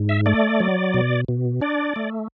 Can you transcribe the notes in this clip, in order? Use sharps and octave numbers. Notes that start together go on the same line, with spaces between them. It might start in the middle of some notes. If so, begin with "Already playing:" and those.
Already playing: G#2
E5
A3 D5
F#3
B2
B2
D4 D5
A3